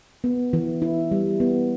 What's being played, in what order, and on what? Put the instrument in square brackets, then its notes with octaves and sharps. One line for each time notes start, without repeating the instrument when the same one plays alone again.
[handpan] B3
E3
E4
G3
B3